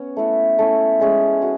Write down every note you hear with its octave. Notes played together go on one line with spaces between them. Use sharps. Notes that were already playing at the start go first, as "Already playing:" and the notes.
Already playing: B3 C#4 C#5
A3 E4 B4
A3 C#4 E4
G#3 C#4 G#4
F#4